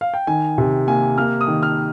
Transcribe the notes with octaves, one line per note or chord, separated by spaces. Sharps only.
F5
G5
D#3 G#5
C3
A#3 G#5
A#3 F6
D#6
D#3
F6